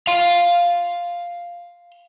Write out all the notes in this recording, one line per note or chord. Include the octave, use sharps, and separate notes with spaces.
F5 C6